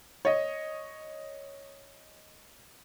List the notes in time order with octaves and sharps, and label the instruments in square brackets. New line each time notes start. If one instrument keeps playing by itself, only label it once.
[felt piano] C#5 D#5